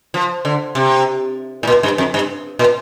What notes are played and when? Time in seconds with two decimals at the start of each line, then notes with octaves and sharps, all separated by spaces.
0.14 F3
0.45 D3
0.75 C3
1.63 A2
1.67 A#2
1.83 G2
1.98 F2
2.14 G2
2.59 A#2